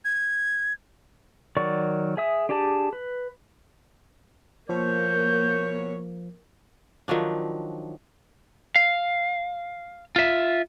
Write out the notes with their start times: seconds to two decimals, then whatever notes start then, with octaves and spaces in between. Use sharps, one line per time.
0.05 G#6
1.57 D#3 F#3 A#4 D5 C#6
2.17 G#4 E5 D#6
2.49 D4 G4 G#4 D5 A5
2.93 B4
4.69 B2 F3 A#3 B3 C#5 G6
7.08 D#3 F3 F#3 D4
8.76 F5
10.16 F4 E5